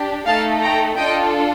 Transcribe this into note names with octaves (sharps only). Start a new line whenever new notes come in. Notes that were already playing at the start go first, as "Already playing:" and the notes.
Already playing: D4 G4
A3 D#4 A4 F5 A5
G5 A#5
D4 F4 A4 D#5 G5